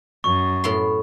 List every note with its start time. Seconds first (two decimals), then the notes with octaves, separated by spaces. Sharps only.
0.24 F#2 C#6
0.64 A2 B3 C6